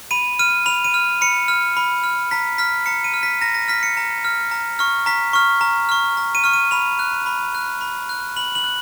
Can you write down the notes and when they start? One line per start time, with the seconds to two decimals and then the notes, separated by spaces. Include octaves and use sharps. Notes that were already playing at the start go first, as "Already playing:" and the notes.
0.11 B5 D#7
0.39 F6 D#7
0.66 B5 F7
0.84 D#7
0.94 F6
1.21 B5 C#7
1.48 F6
1.77 B5
2.04 F6
2.31 A#5 B6
2.58 F6 B6
2.86 A#5 C#7
3.04 D#7
3.14 F6
3.23 B6
3.41 A#5 A#6
3.55 A#6
3.68 F6 B6
3.83 C#7
3.97 A#5
4.25 F6
4.51 A#5
4.79 C#6 F6
5.06 A#5 B6
5.33 C#6 F6
5.61 A#5
5.89 C#6 F6
6.17 A#5
6.35 D#7
6.44 C#6 F6
6.53 D#7
6.71 B5 F7
6.99 F#6
7.26 B5
7.55 F#6
7.81 B5
8.09 F#6
8.37 B5 F#7
8.55 F#7
8.64 F#6